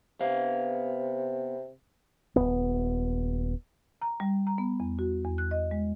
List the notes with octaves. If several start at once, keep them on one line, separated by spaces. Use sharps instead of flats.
C3 B3 F5
D#1 F#2 B3
A#5
G3
A#5
B3
E2
F#4
E2
F#6
D#5
G#3